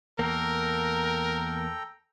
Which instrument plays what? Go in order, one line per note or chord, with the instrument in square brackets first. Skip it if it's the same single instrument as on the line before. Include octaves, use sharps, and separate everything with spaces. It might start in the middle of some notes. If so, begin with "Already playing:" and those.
[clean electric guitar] E2 A#3 [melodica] A4 G5 A#5 [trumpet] A#4